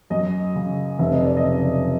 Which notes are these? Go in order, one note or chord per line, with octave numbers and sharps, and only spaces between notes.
F#2 D#5
C#3
F1 E5
D#5
D5
D#5
C#3